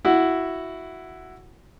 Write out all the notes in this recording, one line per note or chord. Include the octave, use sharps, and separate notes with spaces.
E4 F#4